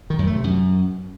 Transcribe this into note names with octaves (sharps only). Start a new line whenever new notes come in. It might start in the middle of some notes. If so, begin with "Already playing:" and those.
D#3
F#2
A3
C3
F#2